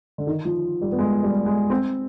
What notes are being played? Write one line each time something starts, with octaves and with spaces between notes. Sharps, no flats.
D3
D#3
F3
G3
B3
G#3
G3
G#3
C4